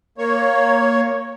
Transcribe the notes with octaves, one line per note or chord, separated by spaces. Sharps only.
A#3 C#5